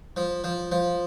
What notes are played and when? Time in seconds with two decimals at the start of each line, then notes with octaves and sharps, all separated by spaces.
0.17 F3
0.44 F3
0.72 F3